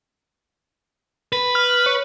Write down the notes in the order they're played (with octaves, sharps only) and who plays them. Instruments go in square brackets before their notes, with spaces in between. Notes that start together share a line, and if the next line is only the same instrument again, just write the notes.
[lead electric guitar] B4
[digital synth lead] F6
C#5